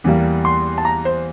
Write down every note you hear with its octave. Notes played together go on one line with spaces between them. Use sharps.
E2 E3 G3 A#3
C6
A5
A#5
C5